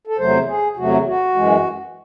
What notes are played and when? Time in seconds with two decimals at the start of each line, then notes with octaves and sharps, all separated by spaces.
0.07 A4
0.18 E2 C3 F#3 A3 C5
0.48 G#4
0.77 E2 C3 F#3 A3 F#4
1.06 F#4
1.35 F#2 E3 G#3